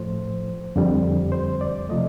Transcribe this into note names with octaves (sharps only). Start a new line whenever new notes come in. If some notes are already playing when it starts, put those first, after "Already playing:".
Already playing: A2 F3 A3 C5
F2 D3 G3
C5
D5
C3 F3 A3 D#5